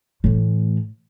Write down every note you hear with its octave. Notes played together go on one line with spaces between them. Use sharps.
A2 E3